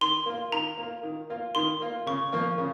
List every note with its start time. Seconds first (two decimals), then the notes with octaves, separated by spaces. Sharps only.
0.01 D#3 C6
0.26 A#3 F4
0.52 D#3 A#5
0.78 A#3 F4
1.03 D#3
1.30 A#3 F4
1.55 D#3 C6
1.82 A#3 F4
2.07 C#3 C#6
2.32 F3 A#3 F4
2.58 C#3